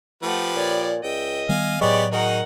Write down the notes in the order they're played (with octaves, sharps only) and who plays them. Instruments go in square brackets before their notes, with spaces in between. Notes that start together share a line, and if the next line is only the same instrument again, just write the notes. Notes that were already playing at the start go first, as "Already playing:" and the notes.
[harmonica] F3 G4 B4 [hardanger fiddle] A3 F#5
[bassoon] A#2 [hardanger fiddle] C#5 D5
[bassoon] C#2 [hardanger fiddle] D#5 E5 [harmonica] G5
[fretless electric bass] D#3 G3 B3 [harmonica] F5 G#5
[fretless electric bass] A2 F#3 [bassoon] G#3 [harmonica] B3 G4 C#5 [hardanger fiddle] D5
[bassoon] D#3 [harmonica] D#4 F#4 G#4 [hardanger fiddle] A#4 F#5